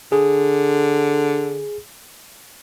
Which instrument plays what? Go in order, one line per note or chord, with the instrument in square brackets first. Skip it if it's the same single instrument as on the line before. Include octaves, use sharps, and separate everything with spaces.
[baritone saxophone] D3 [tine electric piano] G#4